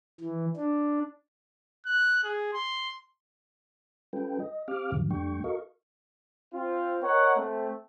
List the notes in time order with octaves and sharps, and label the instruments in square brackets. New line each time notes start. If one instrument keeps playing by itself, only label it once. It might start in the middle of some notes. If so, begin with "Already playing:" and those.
[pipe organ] E3
D4
[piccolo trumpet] F#6
G#4
C6
[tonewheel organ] G3 C#4 F4 A4 B4 G5
D#5
C4 G4 F5 D6 F6
E2 G#2 D3 D#3 F3 F#3
F2 G3 A3 D4 G5 C#6
F#4 A4 A#4 D#5 F5 C#6
[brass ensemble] C4 F4
A#4 C#5 D#5 F#5
A3 C4